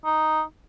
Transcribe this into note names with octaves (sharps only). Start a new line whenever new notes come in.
D#4